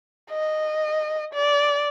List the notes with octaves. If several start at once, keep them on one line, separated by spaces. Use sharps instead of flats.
D#5
D5